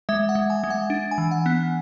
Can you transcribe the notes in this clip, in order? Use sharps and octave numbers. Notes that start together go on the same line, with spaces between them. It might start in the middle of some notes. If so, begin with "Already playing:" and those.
G#3 E5
F#5
G#3
G#5
G#3
F#5
D4
G#5
E3
F#5
B3